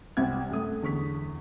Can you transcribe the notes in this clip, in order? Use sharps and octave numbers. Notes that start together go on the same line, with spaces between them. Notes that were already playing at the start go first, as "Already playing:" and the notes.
C2 C3 C4 F#5 F#6 G#6
F#2 A3 D#6
E2 D3 C#6 B6